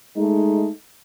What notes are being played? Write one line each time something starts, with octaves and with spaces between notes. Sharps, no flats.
G#3 A3 D#4